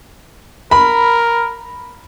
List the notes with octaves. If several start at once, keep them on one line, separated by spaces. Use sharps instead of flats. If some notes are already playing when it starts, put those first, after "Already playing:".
A#4 B5